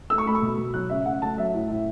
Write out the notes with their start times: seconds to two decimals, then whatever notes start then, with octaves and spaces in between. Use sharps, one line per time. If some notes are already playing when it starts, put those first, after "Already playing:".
0.10 A3 E6
0.18 C#6
0.26 A3 B5
0.35 C#6
0.42 B2
0.58 B2
0.74 F#3 F#6
0.89 C#3 E5
1.05 C#3 F#5
1.22 A3 A5
1.37 F#3 E5
1.54 A2
1.69 A2